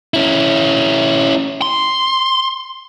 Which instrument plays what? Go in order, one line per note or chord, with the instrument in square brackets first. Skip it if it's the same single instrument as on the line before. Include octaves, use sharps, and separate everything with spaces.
[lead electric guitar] C#4 E4
C6